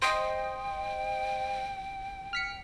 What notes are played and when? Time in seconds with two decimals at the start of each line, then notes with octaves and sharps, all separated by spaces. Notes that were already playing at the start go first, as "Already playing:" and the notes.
0.02 C5 D#5 G5
2.33 F6 B6 C#7